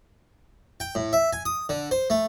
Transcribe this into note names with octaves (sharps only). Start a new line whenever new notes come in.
G5
A2
E5
G#5
D#6
D3
C5
A3